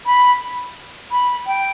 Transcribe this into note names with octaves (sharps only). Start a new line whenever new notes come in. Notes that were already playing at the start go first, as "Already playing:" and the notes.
B5
B5
G5